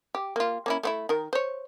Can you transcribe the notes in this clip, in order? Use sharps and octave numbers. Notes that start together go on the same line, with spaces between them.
G4
A#3 F4
A#3 C#4 E4
A3 C4 E4
D#3 A#4
C5 C#5